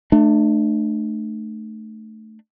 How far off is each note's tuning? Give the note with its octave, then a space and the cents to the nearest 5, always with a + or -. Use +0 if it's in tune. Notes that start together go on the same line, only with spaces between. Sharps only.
A3 +0 D4 +35